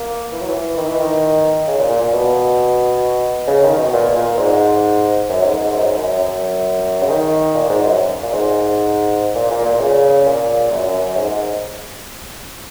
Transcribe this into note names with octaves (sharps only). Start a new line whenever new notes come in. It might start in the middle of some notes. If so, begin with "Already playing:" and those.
Already playing: A#3
E3
F#3
E3
D#3
E3
D#3
C#3
A#2
A#2
A#2
B2
C#3
D#3
B2
A#2
A#2
G#2
F#2
G#2
G#2
F#2
G#2
F#2
F#2
C#3
D#3
A#2
G#2
F#2
A#2
G#2
A#2
A#2
A#2
C#3
A#2
F#2
F#2
F#2
G#2
G#2